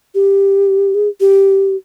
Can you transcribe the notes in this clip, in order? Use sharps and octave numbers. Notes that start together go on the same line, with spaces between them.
G4
G#4
G4